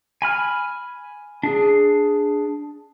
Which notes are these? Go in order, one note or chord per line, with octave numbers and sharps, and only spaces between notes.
G#5 B5 F6
D4 G#4